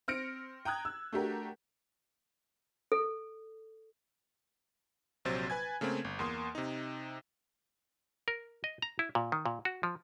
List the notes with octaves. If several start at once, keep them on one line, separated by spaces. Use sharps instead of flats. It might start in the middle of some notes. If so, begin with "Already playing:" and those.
C4 F6 A#6 C#7 D7
G5 A#5 D#6 F#6 G#6
E6
A3 D4 F#4 G4 A#4
A4
A#1 C3 F#3 C5 A6
B4 G#5 G#6
C#3 A3 A#3 C4
G1
E2 A#3 C6 D#6
C3 D#4
A#4
D#5
A#5
E4
A#2
D#3
A#2
F#4
F3